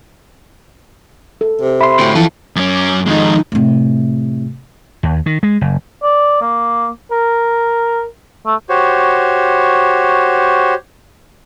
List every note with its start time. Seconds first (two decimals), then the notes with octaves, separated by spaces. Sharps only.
1.41 A4
1.61 C3
1.81 E5 B5 C6
1.99 D2 A2
2.15 E3 F3 E4 F4 A4
2.56 F#2 C#4 D6
3.06 F2 D#3 G#3 D#4
3.52 A2 C3
5.03 D#2
5.26 D#3
5.43 G#3
5.61 F#1
6.03 D5
6.41 A#3
7.12 A#4
8.46 A3
8.69 F#4 G4 C5 C#5